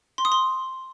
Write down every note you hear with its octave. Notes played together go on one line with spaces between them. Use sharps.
C6
D#6
C6